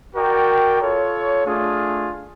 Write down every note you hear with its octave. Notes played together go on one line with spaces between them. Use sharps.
F#4 A#4 D5 G5
F4 A4 C#5
A3 D4 F4 G#4